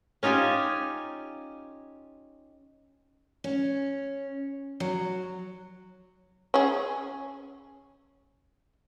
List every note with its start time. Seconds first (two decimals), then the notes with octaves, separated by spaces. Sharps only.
0.23 C#4 D#4 F4 G4 G#5
3.44 C#4
4.80 F#3
6.54 C#4 G#4